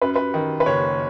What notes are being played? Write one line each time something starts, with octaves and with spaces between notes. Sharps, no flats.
F#2 B4
B4
D#3
B4
F#1 C#5